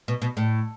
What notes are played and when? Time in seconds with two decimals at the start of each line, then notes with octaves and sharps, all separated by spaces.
0.08 B2
0.22 B2
0.37 A2